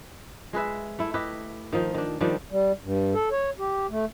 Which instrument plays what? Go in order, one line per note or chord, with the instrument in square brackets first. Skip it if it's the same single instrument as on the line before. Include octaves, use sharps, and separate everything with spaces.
[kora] G#3 G#4 B4 E5
A3 E4
E4 G4 B4 D#5
D#3 F3 D#4
D#3 D4
D#3 F3 G3 D4
[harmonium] G3
G2
A4
C#5
G4
A3